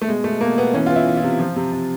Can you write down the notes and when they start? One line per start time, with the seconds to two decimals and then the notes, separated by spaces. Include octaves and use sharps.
0.02 A3
0.08 B2 G#3
0.24 B2 A3
0.41 B2 A#3
0.57 B2 B3
0.74 E3 C#4
0.86 E3 F4
0.96 E4
1.07 E3
1.17 F4
1.24 C3
1.39 F3
1.56 C3
1.72 C3